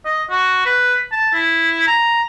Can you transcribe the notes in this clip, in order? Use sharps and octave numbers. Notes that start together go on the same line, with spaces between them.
D#5
F#4
B4
A5
E4
A#5